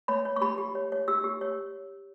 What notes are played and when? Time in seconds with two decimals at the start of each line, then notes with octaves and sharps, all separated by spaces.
0.08 C#5 B5
0.25 C#5
0.36 C#6
0.41 G4 B5
0.58 G4
0.75 C#5
0.92 C#5
1.08 G4 E6
1.24 G4
1.41 C#5